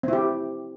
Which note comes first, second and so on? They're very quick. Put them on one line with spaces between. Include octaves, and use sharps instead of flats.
C4 E4 G4